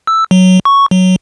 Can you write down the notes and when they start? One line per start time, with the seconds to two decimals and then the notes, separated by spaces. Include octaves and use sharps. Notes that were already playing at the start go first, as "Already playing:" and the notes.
0.07 E6
0.31 F#3
0.65 C#6
0.91 F#3